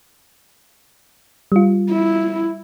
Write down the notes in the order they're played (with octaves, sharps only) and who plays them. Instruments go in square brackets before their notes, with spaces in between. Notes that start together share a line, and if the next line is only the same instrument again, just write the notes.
[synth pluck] G3 F4
[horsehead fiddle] E4